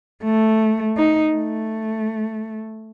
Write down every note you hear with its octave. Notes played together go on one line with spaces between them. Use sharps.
A3
D#4
A3